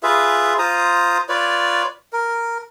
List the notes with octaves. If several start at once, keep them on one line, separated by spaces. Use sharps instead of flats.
F4 G#4 B4 E5
F4 C5 A#5 D#6
F4 B4 C#5 D5
A#4